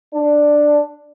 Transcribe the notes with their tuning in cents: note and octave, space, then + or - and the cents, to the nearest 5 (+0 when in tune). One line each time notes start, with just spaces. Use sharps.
D4 +5